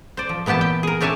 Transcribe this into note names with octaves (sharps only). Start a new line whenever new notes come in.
C5 D5
F3
A#2 E3 B3 G4 A5
G5
G#4 A#4
C4 D4 C#5 E5 G#5 A5